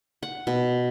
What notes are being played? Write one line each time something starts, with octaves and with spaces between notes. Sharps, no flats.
F#5
B2